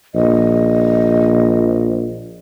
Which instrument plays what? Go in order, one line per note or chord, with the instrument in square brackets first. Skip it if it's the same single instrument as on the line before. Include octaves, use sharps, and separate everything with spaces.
[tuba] A#1 [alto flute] D#5